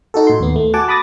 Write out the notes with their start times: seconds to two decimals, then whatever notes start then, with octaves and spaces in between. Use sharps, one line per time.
0.14 D#4 F#4 A4
0.27 A2 C6
0.40 D#2 B3
0.56 A3
0.74 F#4 F#5 G#5 A5 D6
0.88 A5 B5 D6 D#6 A6 A#6